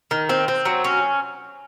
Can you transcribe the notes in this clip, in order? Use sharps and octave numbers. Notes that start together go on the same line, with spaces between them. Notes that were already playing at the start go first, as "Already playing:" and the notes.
D#3
C4
C4
F#3
C#4